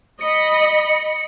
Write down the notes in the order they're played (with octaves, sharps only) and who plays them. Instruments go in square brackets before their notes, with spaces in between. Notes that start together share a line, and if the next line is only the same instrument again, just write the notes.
[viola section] D#5 B5 [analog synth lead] C#7